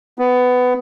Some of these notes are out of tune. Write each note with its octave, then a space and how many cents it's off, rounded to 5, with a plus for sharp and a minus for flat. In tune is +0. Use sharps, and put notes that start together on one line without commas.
B3 +15